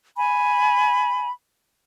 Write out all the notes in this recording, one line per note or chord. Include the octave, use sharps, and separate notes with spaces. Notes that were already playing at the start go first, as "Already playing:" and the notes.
G#5 B5